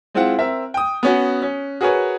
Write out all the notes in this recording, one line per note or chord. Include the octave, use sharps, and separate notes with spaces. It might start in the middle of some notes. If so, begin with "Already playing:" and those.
G#3 C4 E4 F4 F#5
C4 A#4 E5
G5 D#6
B3 C#4 F#4
C#4
F#4 G#4 A#4 B4 C#5